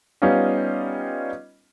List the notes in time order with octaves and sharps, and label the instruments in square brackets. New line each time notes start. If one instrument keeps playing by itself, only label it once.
[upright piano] G3 B3 C#4 D#4 F4 D#5